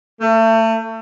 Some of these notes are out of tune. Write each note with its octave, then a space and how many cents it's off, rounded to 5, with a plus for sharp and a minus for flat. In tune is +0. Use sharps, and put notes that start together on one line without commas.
A3 +30